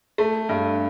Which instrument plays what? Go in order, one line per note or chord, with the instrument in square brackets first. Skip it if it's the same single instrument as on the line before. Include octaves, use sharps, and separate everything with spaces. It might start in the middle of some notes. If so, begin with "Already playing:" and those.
[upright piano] A3
G2